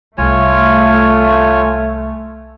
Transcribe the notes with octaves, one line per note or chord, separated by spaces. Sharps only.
C2 A3 F4 C#5 G#5